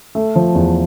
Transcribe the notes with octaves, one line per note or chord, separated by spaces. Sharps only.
A3
F3
E2